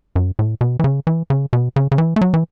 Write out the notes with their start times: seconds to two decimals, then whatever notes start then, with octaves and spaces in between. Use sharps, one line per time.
0.16 F#2
0.39 A2
0.61 B2
0.79 E3
0.84 C#3
1.07 E3
1.30 C#3
1.53 B2
1.76 C#3
1.92 C#3
1.98 E3
2.16 A3
2.21 F#3
2.34 E3